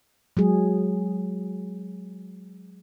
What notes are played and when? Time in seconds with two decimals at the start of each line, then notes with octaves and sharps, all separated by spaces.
0.37 F#3 G#3 G#4